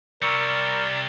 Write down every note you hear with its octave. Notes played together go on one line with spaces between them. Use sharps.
C3 G3 A#4 D5 C#6 E6 C#7